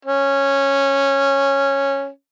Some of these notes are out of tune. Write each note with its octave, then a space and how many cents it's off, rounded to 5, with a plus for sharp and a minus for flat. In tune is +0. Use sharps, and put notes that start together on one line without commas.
C#4 -10